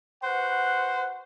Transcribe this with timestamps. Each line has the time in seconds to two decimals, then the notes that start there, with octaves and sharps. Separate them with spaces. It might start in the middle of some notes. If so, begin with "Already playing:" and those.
0.23 F#4 B4 C5 F#5